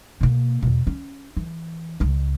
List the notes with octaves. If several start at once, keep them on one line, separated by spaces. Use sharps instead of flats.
B2 A#3
E2 B2
C#4
E3
C#2 G#3